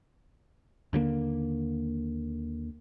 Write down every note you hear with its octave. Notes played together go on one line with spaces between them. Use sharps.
D#2 D3 D#3 A#3